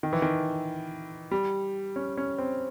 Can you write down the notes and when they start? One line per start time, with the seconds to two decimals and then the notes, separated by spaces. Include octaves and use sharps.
0.03 D#3
0.13 E3
0.22 D#3
1.31 G3
1.96 C#4
2.17 C#4
2.38 C4